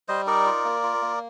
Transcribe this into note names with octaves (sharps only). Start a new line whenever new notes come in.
G3 C5 D#5
D#4 A#4 D5
F4
A#3
F4
A#3